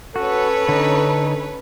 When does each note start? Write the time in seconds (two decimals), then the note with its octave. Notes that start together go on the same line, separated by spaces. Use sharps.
0.16 C#4 F#4 A4 B4 C#5
0.69 D3 D#4